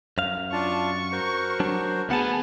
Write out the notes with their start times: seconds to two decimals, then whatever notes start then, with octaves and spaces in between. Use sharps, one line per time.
0.18 F#2 F5
0.53 D4 F4 A5 C#6
1.12 F#4 A#4 C5
1.60 F#3 D4
2.09 D2 B3 G#4 F#5 A5